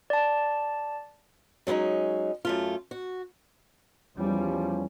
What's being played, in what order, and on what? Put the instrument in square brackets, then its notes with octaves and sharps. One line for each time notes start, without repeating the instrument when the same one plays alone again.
[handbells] D5 A5
[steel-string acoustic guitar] F#3 G#3 B3 C#4 D#4
F#2 A3 F4
F#4
[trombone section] E2 F3 C#4 [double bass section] G3